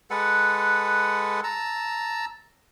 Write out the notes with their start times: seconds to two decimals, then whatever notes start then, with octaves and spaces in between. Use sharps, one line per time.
0.10 G#3 A4 B4 F#5
1.44 A5 A#5 E6